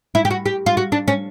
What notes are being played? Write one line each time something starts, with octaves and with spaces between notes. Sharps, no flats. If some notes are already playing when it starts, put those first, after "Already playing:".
E4
G4
F#4
G4
F4
F#4
D4
C#4